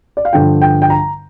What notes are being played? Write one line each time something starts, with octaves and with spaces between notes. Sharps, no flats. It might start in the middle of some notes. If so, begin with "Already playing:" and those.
D5
F5
G2 D3 F3 G5
G5
G5
A#5